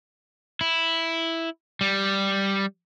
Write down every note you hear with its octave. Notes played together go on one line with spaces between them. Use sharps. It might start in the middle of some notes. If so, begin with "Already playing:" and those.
E4
G3